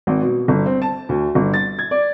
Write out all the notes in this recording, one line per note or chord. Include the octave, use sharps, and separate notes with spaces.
G#1
B2
G1
C4
A5
D2
G1
A6
G#6
D5